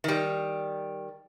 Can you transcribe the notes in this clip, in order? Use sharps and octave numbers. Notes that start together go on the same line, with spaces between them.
D#3 G3